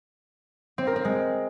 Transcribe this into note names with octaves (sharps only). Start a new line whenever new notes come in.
C4
A#4
C4
G#3